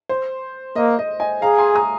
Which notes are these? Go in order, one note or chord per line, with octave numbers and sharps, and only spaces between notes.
C5
A#3 D#5
D#5
D#5 G#5
G#4 F5 A#5
G#5 C6
A#5 D#6